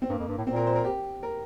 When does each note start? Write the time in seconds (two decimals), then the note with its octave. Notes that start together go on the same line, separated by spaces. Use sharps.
0.02 C4
0.10 G2 A#3
0.19 F2
0.28 G2
0.38 A2
0.47 A#2 C4
0.56 A#4
0.67 C5
0.76 A#4
0.85 G4
1.23 A#4